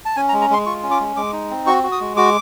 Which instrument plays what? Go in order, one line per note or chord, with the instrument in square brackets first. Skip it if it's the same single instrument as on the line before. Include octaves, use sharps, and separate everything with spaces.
[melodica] A5
C#4 G#5
A#5
G#3
A#5
G#3 C6
F4 C#6
C#4
D6
G#3
G#3 D6
D#4
C4
F#4 C#6
F#4
D#6
G#3
F#4 D6